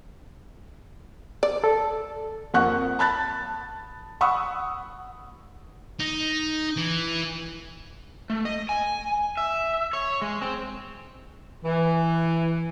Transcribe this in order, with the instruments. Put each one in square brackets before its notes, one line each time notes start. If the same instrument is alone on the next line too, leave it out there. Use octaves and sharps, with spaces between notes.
[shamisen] D5
[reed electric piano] A4
[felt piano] F2 A#3 F#5 C#6 F#6
A5 B5 F#6 A6
F#5 B5 C#6 D#6 E6
[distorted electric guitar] D#4
E3
[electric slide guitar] A3
D#5
G#5
E5
C#5
G#3
C4
[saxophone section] E3